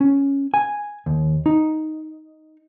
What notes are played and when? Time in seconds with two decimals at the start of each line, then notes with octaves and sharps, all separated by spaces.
0.01 C#4
0.54 G#5
1.06 D#2
1.46 D#4